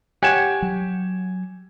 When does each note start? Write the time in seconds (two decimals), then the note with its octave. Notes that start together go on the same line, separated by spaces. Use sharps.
0.23 G4 C#5 F#5 G#5 G#6 E7
0.62 F#3